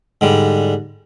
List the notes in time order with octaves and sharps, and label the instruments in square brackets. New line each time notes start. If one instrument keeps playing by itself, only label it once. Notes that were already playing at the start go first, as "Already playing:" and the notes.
[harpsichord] G#2 D3 G3